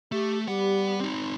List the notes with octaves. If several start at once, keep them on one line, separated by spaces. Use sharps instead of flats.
A3 G4
G3 B3 G4 F#5
C4 D#4